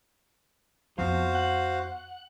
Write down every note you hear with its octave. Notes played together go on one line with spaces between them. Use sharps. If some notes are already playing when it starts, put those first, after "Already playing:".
F2 F3 B3 C4 F#4 C5 F5
F#5